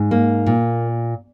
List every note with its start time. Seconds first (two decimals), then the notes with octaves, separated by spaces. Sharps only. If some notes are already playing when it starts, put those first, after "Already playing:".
Already playing: G#2
0.11 A#3
0.46 A#2